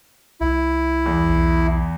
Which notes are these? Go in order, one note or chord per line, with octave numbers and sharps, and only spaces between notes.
C2 E4
E2
B1